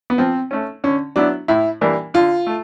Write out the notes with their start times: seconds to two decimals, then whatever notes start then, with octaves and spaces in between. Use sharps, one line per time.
0.10 B3
0.18 F3 C4
0.51 A3 C#4
0.84 D3 C#4
1.16 F#3 B3 D4 E4
1.48 A2 E4
1.81 E3 G3 A#3 D4
2.14 D3 F4
2.47 A3